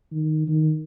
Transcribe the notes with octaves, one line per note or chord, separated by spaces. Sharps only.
D#3
D#3